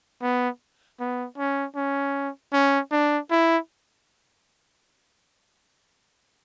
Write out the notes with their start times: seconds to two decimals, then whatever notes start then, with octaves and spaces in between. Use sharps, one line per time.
0.22 B3
1.00 B3
1.38 C#4
1.76 C#4
2.53 C#4
2.92 D4
3.31 E4